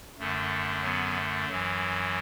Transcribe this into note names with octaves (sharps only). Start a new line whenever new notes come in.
F#2 D3 A3
F#3 B3
A3
F#2 E3 F#3